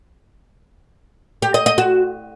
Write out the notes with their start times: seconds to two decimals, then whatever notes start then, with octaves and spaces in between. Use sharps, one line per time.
1.42 G4
1.54 D#5
1.66 D#5
1.78 F#4